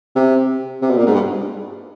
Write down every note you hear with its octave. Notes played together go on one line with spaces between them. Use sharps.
C3
C3
B2
A#2
G#2
G2